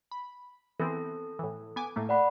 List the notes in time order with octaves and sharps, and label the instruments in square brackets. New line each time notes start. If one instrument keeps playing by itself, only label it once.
[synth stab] B5
[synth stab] E3 B3 C4 [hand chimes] A4
[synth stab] A2 E3
B3 G#5 D6
A2 A3 A#3
[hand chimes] D5 F#5 B5